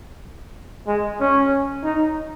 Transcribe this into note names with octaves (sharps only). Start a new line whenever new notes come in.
G#3
C#4
D#4